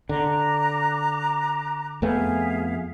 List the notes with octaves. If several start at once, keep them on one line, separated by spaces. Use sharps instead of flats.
D3 A#5 D6 F#6
F2 A3 B3 G#4 E5 F5